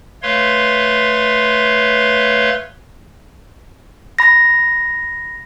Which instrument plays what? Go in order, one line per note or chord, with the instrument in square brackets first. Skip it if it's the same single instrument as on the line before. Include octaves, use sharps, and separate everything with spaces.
[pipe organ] A3 B4 C#5 F5 C6
[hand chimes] B5 A#6